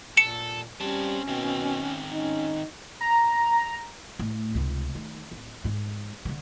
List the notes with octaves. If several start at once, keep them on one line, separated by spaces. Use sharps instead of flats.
A#2 A4 C#7 E7
G3 C4 C#4 A5
B2 D#3 C4
C#4 D#4
A#5
A2
F1 C#2
D#3 A3
D1
G#2 G#3
D3 D#3